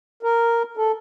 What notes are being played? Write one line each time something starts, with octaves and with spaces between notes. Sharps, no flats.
A#4
A4